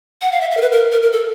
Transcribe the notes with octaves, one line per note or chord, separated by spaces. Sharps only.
F#5
F5
E5
E5
A#4
B4
A#4
A#4
A#4
A4